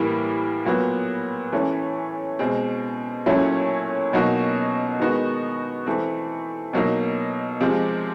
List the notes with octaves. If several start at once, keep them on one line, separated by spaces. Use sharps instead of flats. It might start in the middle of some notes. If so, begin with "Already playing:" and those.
Already playing: A2 E3 G3 A#3
A#2 F#3 B3
E3 A3 C#4
B2 G#3 C4
A#2 F#3 A3 C#4 E4
B2 F#3 A#3 D#4 F#4
D#3 G#3 B3 D#4 F#4
E3 A3 C4
B2 F#3 A#3 D#4
C3 F3 G#3 C4